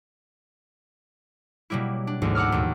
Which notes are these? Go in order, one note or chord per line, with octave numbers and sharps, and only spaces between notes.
B2 F#3 G3 A#3 E4
D4
A1 D2 G#2 B2
F#5 A#5 D6 E6 F6
D#2 A#2